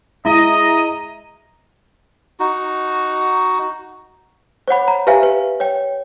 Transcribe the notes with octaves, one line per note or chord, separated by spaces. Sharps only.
G#3 E4 D#5 A#5
D#4 F#4
C5 C#5 F#5 B5
A#5
G4 B4 E5 F5 G#5
B4
C#5 G5